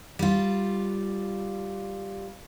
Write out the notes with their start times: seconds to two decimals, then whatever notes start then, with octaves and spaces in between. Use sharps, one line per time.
0.19 G3 F4